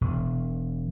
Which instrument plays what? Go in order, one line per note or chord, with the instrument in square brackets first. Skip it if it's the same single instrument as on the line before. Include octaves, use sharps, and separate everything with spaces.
[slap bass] E1